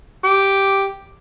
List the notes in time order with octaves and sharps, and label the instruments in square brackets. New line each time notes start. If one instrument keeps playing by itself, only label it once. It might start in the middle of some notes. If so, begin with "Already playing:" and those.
[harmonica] G4